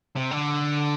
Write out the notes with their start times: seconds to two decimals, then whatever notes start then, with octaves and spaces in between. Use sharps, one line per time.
0.16 C3
0.31 D3